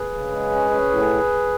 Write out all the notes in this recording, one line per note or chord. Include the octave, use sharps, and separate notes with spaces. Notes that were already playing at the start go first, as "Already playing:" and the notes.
Already playing: G#4 B4
C#3
G#3
C#4
C#4
A2